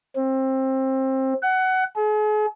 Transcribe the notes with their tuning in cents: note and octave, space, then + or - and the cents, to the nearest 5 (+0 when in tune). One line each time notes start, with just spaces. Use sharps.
C4 +20
F#5 +20
G#4 +40